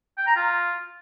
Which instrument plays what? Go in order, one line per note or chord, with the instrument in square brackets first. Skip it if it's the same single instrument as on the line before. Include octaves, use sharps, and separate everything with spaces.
[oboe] G5
A#5
F4